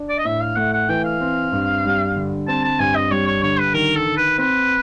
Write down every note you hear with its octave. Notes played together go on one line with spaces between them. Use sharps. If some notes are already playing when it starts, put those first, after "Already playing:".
Already playing: D4
D5
D#5
A2 E5
F5
A3 F#5
F#5
E3 G5
F5
C4
G2
G3
D3
C4 A5
A5
G2 G#5
D#5
G3 C#5
C#5
D3 C#5
B4
D#3 A#4
A4
D#3
B4
C4 B4